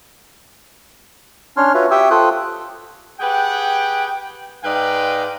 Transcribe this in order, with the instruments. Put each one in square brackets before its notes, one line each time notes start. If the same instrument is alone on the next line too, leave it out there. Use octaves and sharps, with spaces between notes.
[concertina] C#4 D4 C#5 C6 F6
F4 F#4 B4 C#5 E5
G4 E5 G5 C#6 D#6 E6
F4 A4 C5 G5 D#6 F#6
[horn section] G4 G#4 B4 F#5 G5
G#2 B4 D5 D#5 F5 G5